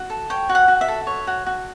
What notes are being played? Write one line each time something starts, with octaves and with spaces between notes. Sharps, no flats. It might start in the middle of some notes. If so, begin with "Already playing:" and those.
Already playing: F#4
A4
C#5 G5
F#4
F#5
F#4
E5
A4
C#5
F#4
F#4